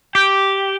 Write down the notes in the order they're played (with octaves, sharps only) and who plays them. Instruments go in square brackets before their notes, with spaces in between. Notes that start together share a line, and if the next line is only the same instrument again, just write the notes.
[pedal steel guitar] G4 [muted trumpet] G5